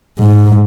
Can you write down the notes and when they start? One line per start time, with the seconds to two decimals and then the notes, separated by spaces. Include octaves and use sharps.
0.18 G#2